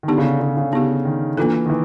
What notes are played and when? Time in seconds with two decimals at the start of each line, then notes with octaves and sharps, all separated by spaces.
0.03 D#3
0.08 D3 B3 D#4 G4
0.18 C#3
0.24 D3
0.41 C#3
0.57 C#3
0.73 C#3 B3 D#4 G4
1.05 D#3
1.37 E3 A#3 D4 F4 A4
1.66 D#3
1.70 E3